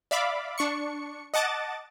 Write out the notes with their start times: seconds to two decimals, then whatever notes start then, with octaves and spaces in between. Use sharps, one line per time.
0.11 D5 E5 F5 B5 D6
0.58 D4 C#6 C#7
1.34 D#5 F#5 A5 D6 A6